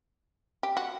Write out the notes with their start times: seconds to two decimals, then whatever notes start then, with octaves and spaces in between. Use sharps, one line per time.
0.63 G4
0.77 F#4